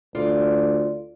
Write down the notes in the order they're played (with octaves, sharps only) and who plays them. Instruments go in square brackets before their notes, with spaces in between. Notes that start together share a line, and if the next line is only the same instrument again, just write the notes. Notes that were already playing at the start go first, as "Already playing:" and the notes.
[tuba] D2 [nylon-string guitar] F4 D5